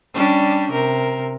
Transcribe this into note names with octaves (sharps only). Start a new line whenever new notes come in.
G3 C#4 D4
C3 A#4